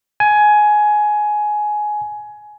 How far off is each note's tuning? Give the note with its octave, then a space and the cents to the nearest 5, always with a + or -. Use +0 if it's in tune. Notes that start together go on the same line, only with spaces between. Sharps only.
G#5 +15